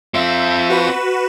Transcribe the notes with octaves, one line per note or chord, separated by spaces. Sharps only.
C4 F4 E5
F#4 B4 E7